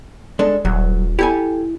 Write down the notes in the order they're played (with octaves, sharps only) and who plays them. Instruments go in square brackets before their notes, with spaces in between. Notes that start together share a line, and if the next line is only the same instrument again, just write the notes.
[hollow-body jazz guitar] G#3 D4 A4
[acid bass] D#1 [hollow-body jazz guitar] F#3
[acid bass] E4 [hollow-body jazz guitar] G4 A4 G#5